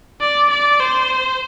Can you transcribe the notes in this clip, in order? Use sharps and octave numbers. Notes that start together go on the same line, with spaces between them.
D5
D5
C5